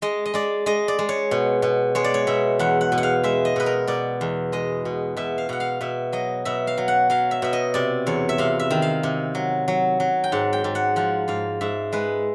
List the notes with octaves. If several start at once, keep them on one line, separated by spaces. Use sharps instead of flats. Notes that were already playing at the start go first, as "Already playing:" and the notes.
G#3 D#5
D#5
G#3 D5
G#3 D#5
D5
G#3
C#5
B2
B2
G#3 C#5
D5
C#5
B2 E5
E2 F#5
F#5
B2
F#5
F5
G#3 E5
D#5
B2 B4
A#4
B2 D5
E2
G#3 D#5
B2
B2 E5
F5
B2 F#5
F5
B2 E5
F#3 D#5
B2 E5
F5
F#3
F#5
F#3 F5
E5
B2 E5
D#5
C3 D5
E2 C#5
E5
C3 F5
E5
D#3
F5
C3
F#3
F#3
F#3
G5
G#2 F#5
G5
G#2
F#5
F3 F#5
G#2 F5
G#2 E5
G#3 B4